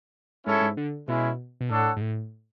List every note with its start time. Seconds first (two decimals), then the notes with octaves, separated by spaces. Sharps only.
0.46 G#2 C#4 E4 A4 C#5
0.61 G#2
0.77 D3
1.08 B2 G#3 C#4 E4
1.61 B2
1.70 A2 D4 A4 C#5 F#5
1.96 G#2
2.01 A2